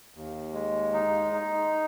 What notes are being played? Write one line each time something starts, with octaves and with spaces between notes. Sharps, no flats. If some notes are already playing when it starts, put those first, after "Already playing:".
D#2
G#3
D#4
D#4